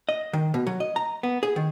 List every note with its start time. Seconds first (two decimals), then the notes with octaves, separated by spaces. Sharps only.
0.09 D#5
0.33 D#3
0.54 B2
0.67 F#3
0.80 D#5
0.96 A#5
1.23 B3
1.43 G#4
1.56 D#3